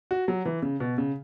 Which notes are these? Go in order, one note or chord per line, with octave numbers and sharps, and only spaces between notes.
F#4
F#3
E3
C#3
B2
C#3